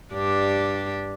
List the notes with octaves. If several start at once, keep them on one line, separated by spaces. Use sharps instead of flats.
G2 D4 G4